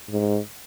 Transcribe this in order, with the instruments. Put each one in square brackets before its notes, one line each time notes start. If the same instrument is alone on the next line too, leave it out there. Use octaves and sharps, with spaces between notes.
[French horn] G#2